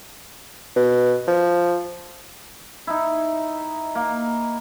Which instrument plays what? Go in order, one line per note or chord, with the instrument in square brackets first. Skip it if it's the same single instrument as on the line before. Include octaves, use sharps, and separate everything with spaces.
[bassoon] B2
F3
[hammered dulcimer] D#4 E4
A#3